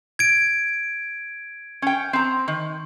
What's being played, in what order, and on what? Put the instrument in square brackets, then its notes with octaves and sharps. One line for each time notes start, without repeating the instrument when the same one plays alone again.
[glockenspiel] G#6 D7
[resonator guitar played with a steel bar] C#4 G5
C4 A#5
D#3